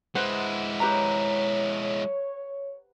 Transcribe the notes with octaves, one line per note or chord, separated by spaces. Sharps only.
G#3 E4 B4 C5 F#5
G4 B4 C#5 A#5